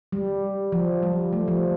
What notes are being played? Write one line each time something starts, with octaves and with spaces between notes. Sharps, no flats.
G3
F3
G3
A3
F3